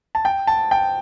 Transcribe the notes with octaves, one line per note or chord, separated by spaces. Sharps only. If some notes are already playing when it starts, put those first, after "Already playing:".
A5
G5
A5
G5